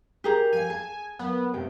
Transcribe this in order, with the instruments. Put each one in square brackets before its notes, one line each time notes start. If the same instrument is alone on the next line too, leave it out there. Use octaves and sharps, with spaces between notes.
[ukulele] G4 G#4 A#5 [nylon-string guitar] A#4
[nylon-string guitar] F3 A4 F5 [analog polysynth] G#5
[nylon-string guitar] G#4 [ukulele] A5
[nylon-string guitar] F#3 A#3 [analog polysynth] B3
[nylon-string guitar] G2 A3 G5 [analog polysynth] C3